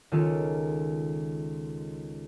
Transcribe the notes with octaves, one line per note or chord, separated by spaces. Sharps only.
C#2 D#3 C#4 F4 A4